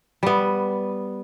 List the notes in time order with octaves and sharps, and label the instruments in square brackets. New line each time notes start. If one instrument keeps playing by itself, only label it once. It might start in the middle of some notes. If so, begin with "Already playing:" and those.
[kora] G3 B3